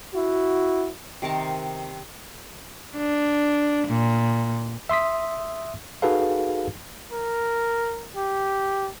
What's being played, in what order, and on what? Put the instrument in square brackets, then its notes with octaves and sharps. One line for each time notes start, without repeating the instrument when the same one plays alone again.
[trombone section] E4 F#4
[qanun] C3 D#3 A#4 A5
[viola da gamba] D4
A#2
[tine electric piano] E5 C6 D#6 B6
D#4 F#4 G#4 A4 B4 F5
[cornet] A#4
G4